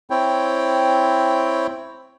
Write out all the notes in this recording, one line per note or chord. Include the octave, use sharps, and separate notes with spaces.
C4 E4 C#5 G5